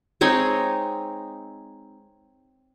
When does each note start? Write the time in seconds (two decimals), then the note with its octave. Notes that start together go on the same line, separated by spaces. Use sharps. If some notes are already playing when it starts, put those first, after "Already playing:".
0.21 G#3 C4 D#4 C#5